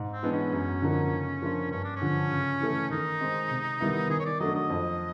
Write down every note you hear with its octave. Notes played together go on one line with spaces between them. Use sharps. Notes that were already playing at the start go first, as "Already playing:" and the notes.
Already playing: G#2
C4
E3 G#3 B3 D4
C#4
F#2
D3 F3 A#3 D#4
C#3
F3 A#3 D4 F4
G2 C#4
D4
C#4
D3 F3
C#3
E3 A3
D#3 D#4
G#3 C4
C3
D#3 G3 B3 E4
D#3 G#4
C#5
D5
F#3 A3 D4 D#5
D#5
F2